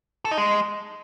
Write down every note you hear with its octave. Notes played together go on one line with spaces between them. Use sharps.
A4
D#4
G#3